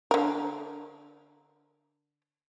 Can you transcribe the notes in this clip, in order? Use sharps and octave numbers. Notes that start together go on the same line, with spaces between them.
D3 A#4